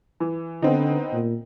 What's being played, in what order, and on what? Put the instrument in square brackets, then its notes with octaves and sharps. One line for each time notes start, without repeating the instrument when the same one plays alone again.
[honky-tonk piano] E3
[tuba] D3 [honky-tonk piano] B3 C4 D#4
[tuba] A#2